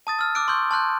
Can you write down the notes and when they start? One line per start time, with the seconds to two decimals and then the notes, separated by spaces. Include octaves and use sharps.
0.07 A5 D#6 A6
0.19 E6 F6
0.35 D6 E6 F#6 D7
0.48 C6 C#6 E6 G6
0.71 A5 C6 F#6 G6